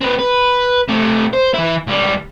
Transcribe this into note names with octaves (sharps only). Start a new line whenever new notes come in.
C4 B4
B4
C3 A3
C5
E3 E4
C#2 G3